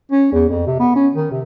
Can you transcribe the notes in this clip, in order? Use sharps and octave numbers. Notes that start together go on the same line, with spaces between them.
C#4
E2
F2
C3
B3
C#4
D#3
C3